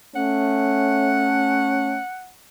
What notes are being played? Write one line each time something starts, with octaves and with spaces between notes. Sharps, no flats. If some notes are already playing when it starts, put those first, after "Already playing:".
A3 C#4 F#5